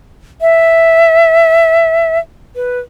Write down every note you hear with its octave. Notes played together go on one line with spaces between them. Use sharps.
E5
B4